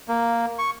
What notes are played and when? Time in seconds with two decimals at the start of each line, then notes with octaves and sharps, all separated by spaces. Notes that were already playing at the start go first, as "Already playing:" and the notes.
0.08 A#3
0.59 C#6